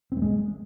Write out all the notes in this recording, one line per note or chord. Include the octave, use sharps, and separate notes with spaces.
C4
A3
G#3